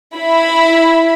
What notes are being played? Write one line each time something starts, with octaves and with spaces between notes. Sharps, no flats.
E4 B5